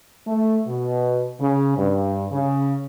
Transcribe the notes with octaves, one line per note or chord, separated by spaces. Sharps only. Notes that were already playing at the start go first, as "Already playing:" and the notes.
A3
B2
C#3
G2
C#3